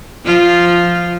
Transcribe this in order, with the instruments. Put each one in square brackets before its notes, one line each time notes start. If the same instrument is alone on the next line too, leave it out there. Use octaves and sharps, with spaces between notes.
[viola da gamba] F3 F4